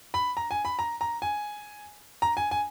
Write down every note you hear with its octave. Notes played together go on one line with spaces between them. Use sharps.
B5
A#5
G#5
B5
A#5
A#5
G#5
A#5
G#5
G#5